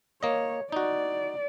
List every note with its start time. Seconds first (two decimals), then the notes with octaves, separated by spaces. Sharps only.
0.23 A#3 C#5 D#5
0.72 D#4 F#4 D5